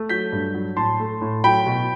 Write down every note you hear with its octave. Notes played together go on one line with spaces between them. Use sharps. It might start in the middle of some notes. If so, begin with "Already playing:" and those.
Already playing: A3
F#3 G6 B6
G2
F#3
A2 A5 C6
A3
A2
F#3 G5 B5
B2